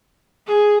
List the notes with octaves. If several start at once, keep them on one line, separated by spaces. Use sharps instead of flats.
G#4